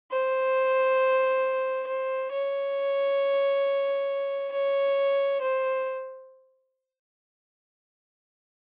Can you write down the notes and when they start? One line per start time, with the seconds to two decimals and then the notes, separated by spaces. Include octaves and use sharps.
0.11 C5
1.88 C5
2.32 C#5
4.53 C#5
5.42 C5